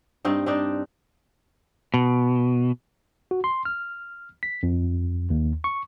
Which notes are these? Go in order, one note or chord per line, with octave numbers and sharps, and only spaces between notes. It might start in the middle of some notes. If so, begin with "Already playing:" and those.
G2 C4 D#4
C4 D4 D#4
B2
F#4
C6
F6
B6
F2
D#2
C#6